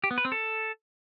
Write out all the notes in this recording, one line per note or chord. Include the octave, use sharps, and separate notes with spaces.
G4
B3
B4
C4
A4